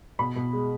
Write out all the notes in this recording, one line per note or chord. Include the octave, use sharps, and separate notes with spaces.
B2 B5
B2
G#3